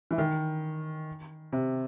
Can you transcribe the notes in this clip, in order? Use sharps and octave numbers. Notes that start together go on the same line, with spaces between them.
E3
D#3
C3